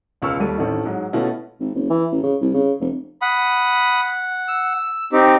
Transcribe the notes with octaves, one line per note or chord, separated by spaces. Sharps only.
E1 C#2 C#6 E6 F6
D#2 G3 A3 D#7
A1 D#3 A3 C4 E4 A4
G#2 F#3 G#3
B2 A3 B3 C#4 E4 F4
G#1
F#1
E3
A1
C#3
C2
C#3
F1
F#5 B5 D#6
E6
C4 D#4 G4